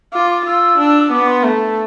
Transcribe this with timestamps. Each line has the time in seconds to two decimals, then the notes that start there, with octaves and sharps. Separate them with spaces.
0.13 F4 D6
0.30 D6
0.46 F4 E6
0.78 D4
1.11 B3 D6
1.27 C6
1.44 A3